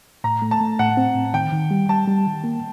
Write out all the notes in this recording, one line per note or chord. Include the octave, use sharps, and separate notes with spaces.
A2 A#5
A3
A5
A3
A2 F#5
C4
A2
D#3 G5
D#3
G3
G3 A5
G3
D#3
A#3